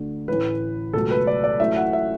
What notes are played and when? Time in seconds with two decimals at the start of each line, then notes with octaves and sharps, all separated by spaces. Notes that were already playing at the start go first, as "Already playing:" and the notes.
Already playing: D2 D3 A3
0.28 A1 A2 E3 B4
0.93 C#2 B2 F#3 A3 A4
1.11 B4
1.27 D5
1.44 D5
1.59 A1 A2 F#3 A3 E5
1.76 F#5
1.93 E5